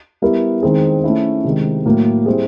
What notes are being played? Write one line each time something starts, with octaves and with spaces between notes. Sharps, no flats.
G3 B3 E4 G4 A#4
D#3 G#3 C4 D#4 G#4
A3 C#4 E4
C3 D#3 G#3
A2 F#3 A#3
G3 C4 E4 G#4